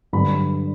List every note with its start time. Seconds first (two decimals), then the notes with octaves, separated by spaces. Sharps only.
0.13 G2 D3 F#3 B5